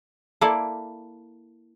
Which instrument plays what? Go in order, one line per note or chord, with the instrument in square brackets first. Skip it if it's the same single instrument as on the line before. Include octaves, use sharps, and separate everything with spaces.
[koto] A#3 E4 A4 D5